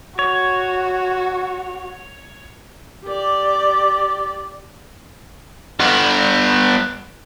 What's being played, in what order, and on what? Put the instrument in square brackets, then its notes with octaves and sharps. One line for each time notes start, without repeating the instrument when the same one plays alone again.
[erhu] F#4 [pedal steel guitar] C#5
[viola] G4 D5
[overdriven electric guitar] G2 B3